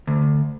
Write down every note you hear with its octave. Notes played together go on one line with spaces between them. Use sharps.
D2